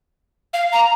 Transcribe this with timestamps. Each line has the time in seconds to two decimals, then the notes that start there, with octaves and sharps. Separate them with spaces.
0.54 F5
0.73 A#5